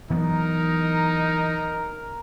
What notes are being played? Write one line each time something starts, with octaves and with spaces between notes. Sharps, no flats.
E3 F#3 B3 D#4 A#4